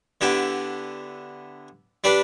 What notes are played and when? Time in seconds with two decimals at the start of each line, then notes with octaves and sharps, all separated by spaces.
0.21 D3 B3 E4 G4
2.04 G3 D4 B4 D5